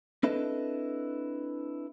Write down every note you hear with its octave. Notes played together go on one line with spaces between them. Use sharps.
C4 D4 E4 A4 B4 D#5